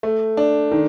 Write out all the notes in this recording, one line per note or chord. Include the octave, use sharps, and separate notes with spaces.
A3
D4
D#3